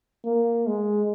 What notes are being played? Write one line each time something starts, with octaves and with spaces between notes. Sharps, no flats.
A#3
G#3